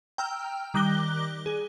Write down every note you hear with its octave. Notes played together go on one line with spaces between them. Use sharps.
G5 A#5 E6 F6
D#3 G3 D6 F#6 A#6 G7
G#4